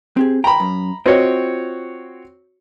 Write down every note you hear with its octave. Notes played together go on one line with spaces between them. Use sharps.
C4 G4 G#4
G5 A#5 B5
F#2
C4 F4 F#4 C#5 D#5 G5